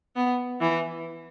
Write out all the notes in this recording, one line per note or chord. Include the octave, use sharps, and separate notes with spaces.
B3
E3